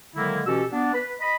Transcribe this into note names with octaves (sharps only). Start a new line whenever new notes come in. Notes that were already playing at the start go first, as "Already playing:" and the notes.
D3 D#3 F#3 G#3 A#3 E4
B2 E3 C#4 G4 A4 E6
B3 D4
B4 B5
D#5 B5